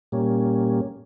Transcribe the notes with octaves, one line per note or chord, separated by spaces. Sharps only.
A#2 G3 A#3 C#4